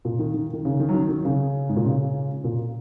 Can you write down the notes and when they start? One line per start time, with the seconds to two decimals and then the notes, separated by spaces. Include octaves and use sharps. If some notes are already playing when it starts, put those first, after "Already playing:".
0.05 A#2
0.19 D#3
0.34 D#3
0.53 D#3
0.65 C#3
0.80 D#3
0.89 F#3
0.94 D#3
1.09 D#3
1.25 C#3
1.69 G#2
1.76 A#2
1.85 C#3
2.44 A#2